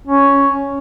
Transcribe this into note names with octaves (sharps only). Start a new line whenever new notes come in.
C#4